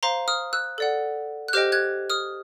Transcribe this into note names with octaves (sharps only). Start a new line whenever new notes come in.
C5 F5 A#5 C6
D#6 F6
E6 F#6
A4 D5 F#5
F#6
G4 C5 D#5 G5 F6 G6
F#6 G#6
D#6 F6